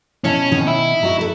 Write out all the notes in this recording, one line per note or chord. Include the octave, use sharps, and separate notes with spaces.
B2 C#4 E4 A5
B2 D#3 D#4
E4
F#4 D#5 A#5
A4 B4